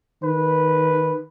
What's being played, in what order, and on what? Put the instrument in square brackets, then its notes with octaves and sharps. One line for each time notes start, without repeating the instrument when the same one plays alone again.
[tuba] D#3 [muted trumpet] B4